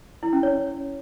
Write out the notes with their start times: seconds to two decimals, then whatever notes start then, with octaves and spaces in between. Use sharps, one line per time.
0.23 E4
0.33 C#4
0.43 C#5